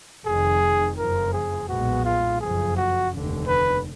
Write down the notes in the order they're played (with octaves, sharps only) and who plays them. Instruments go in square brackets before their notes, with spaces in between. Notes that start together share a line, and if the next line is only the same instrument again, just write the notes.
[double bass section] F1 F2 D#3 [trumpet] G#4
[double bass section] F#1 F2 F3 [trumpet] A#4
[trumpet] G#4
[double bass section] B1 A#2 G#3 B3 [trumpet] F#4
[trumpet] F4
[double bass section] F#1 F2 F3 [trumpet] G#4
[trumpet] F#4
[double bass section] F1 D#2 D3
[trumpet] B4